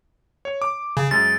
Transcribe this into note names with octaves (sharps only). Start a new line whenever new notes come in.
C#5
D6
C#3 G#5
F#2 G#3 A6